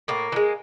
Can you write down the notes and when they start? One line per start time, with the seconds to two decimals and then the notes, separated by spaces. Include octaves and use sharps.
0.08 A2 A#3
0.32 E3
0.36 G#3